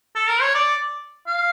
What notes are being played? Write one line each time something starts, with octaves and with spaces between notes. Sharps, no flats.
A4
A#4
C#5
D5
F5